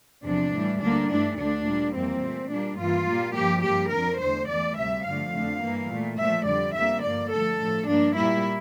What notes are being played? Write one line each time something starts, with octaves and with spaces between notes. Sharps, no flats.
E2 C3 F3 D4
A2 E3 G3
D2 D3 G3 A#3 D4
G2 E3 A3 D4
D2 D3 A3 D4
A#2 G3 A#3
F2 E3 G3 A#3 C4
A#2 A3
A#2 G3 A#3 D4
G2 E3 A#3 F4
A#2 G3 A#3
G2 F3 A#3 G4
G2 F3 A#3 G4
F2 D3 F3 A#4
E2 D3 A3 C5
E2 E3 A3 D5
D2 C3 G3 E5
G2 D3 F3 A3 F5
F2 D3 A3
G2 E3 A#3
A#2 A3
A#2 F3 A3 E5
F2 D3 G3 D5
F2 D3 G3 A#3 E5
G2 F3 A#3 D5
G2 D3 F3 A3 A4
A2 F3 A3
G2 F3 A#3 D4
A#2 G3 A#3 E4